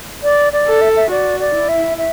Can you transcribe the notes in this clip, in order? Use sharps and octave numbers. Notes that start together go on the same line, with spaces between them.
D5
D5
A4
E5
E5
F#4 D5
D5
E4
E5
E5